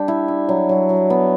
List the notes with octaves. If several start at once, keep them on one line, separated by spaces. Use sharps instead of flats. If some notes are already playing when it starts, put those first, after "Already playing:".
Already playing: G3 D4 G4
E4
E4
F#3
F#3
F#3
B3